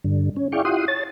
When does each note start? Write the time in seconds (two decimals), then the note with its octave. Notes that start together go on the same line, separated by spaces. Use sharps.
0.04 G2 D3
0.36 C#4
0.52 E4 G#4 D5 F5 G5 C#6
0.65 E4 F4 G4 F#5 C6 D#6
0.88 C#5 A5 A6